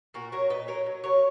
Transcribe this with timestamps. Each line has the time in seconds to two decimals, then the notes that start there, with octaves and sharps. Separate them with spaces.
0.14 A#2 F#4 A#4
0.32 F#3 A#4 C#5
0.50 A#2 B4 D#5
0.68 F#3 A#4 C#5
0.86 F#3
1.04 F#3 A#4 C#5